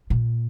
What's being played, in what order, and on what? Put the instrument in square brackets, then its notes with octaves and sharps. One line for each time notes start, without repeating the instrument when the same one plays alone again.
[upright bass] A#2